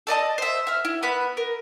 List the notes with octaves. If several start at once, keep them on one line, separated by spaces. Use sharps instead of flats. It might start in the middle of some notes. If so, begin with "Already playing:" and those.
A4 D5 D#5 A5
C5 E5
E5 F6
E4
B3 B5 F#6
A#4